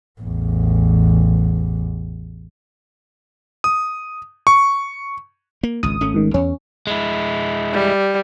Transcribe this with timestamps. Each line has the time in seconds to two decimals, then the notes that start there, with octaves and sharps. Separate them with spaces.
0.21 A1 E2
3.64 D#6
4.47 C#6
5.63 A#3
5.83 G#1 C#2 D#6
6.01 G#1 A3 C#4
6.14 G#2 D#3
6.34 E2 C#4
6.87 G#3 E4
7.73 G3